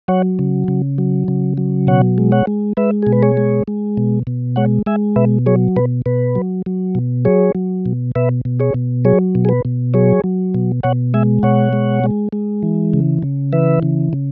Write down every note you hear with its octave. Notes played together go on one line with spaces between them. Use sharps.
F#3 C#5 F#5
C#3
C#3
F#3
C#3
F#3
B2 C#5 F#5
G#3
C#5 F#5
G#3
G#3 B4 E5
B2 G#4
B4
G#4 C#5
G#3
G#3
B2
B2
G#3 C#5 F#5
G#3 E5 G#5
B2 B4 E5
F#3 G#4 C#5
B2 B4
B2 B4
F#3
F#3
B2
F#3 G#4 C#5
F#3
B2
B2 B4 E5
B2
G#4 C#5
B2
F#3 G#4 C#5
B2
G#4
B4
B2
F#3 G#4 C#5
F#3
B2
B2 C#5 F#5
G#3 E5 G#5
B2 C#5 F#5
G#3
G#3
G#3
E3
C#3
C#3
E3 B4 E5
C#3
C#3